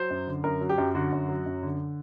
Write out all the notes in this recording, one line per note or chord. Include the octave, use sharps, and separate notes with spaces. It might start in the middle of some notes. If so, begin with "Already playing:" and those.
Already playing: F#3 C5
F#2
D3
F#2 A#4
F#3
G4
F#2
D3 F#4
F#2
F#3
F#2
D3